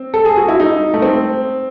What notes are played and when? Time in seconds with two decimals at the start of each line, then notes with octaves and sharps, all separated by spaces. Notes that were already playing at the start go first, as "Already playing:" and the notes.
Already playing: C4
0.14 A4
0.25 G#4
0.37 F#4
0.48 E4
0.60 D#4
0.94 A3
1.02 C4